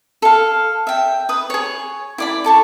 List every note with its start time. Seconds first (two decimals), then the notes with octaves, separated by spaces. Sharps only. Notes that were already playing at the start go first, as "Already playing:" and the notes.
0.22 A4 F5
0.87 E5 G5
1.29 B4 D#6
1.50 G#4 C#5
2.18 E4 D5 B5
2.44 E4 A4 C#6